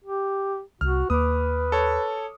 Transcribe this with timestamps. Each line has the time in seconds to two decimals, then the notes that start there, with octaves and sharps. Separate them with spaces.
0.04 G4
0.81 C2 F#4 F6
1.10 D#2 A#3 B4 D6 D#6
1.72 A4 C#5